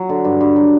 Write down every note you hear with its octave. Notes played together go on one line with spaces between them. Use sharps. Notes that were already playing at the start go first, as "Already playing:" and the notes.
Already playing: F#3
D3
G2
G2
F#3